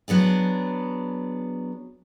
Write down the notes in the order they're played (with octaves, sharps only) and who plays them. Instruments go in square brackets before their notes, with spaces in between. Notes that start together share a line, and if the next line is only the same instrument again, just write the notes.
[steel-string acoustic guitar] F#3 B3 D4 G#4